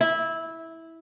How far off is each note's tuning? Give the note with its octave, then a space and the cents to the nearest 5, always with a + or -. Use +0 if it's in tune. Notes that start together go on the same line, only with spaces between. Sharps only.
E4 -10